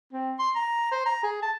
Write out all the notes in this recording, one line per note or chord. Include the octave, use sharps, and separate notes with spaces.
C4
C6
A#5
C5
A#5
G#4
A5